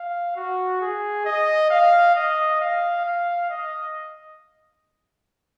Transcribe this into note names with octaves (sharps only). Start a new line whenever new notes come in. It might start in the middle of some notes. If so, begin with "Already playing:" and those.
Already playing: F5
F#4
G#4
D#5
F5
D#5
F5
F5
D#5